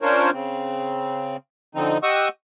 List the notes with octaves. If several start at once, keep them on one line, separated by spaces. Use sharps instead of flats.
C#4 D4 F4 A#4 C5 C#5
C#3 C4
D3 F3 C4 D#4
G4 D#5 F#5 C#6 D#6 E6